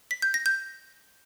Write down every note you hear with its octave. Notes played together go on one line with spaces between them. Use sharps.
B6
G6
A#6
G6